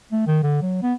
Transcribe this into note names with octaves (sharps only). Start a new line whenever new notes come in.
A3
D#3
D3
F#3
B3